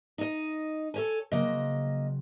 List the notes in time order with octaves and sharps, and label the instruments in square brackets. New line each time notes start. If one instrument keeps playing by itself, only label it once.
[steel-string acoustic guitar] D#4 D#5
A4 C#5 G#5
[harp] C#3 F#3 C4 [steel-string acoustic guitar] A#3 D#5